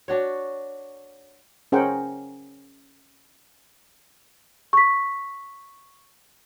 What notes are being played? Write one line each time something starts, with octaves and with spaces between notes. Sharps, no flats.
D4 F#4 C#5
C#4 G#4 A#4 C5 F#5 G5
C#6 B6